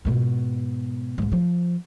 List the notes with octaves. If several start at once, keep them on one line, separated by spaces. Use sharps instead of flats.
G#2 B2
C2 G#2
F3